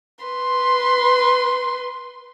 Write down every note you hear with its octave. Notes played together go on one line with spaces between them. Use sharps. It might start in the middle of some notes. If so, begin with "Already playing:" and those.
B4 C6